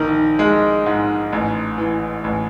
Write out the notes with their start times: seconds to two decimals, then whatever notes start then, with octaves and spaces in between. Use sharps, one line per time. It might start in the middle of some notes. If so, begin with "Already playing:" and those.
Already playing: A#1 D#3
0.39 G#3
0.86 G#2
1.33 A1
1.78 E3
2.24 A1